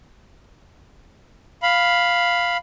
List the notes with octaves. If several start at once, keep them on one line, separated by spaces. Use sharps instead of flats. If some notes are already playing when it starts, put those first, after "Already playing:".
F5 B5